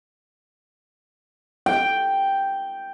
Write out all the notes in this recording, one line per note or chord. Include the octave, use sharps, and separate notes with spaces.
G5